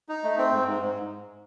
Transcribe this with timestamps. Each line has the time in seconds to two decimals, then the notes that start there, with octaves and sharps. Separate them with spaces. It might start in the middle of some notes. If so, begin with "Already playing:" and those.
0.09 D#4
0.24 A3
0.38 C4
0.52 G#2
0.67 G#2
0.82 G#2